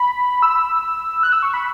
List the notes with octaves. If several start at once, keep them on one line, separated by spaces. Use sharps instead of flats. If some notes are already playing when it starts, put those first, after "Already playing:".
Already playing: B5
E6
F#6
E6
C#6
B5